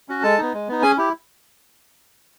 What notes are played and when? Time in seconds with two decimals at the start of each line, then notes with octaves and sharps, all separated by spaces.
0.09 C#4 F#4
0.23 G#3 A4 A5
0.38 B3 D#4
0.53 G#3
0.68 B3 D#4
0.82 C#4 G#4 G#5
0.97 E4 G4